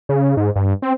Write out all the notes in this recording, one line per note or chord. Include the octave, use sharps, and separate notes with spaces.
C#3
G#2
G2
C4